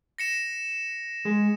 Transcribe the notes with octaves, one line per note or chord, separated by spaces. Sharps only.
A#6 C#7 E7
G#3 G#4